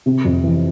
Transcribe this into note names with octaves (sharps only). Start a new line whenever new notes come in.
C3
F2
E3